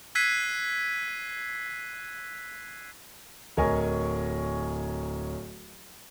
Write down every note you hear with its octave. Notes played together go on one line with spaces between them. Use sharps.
E6 F#6 G#6 B6 C7 D#7
D1 A#4 C#5 D#5 G#5 C#6